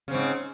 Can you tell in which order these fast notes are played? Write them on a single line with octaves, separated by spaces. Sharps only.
C#3 C4 G#2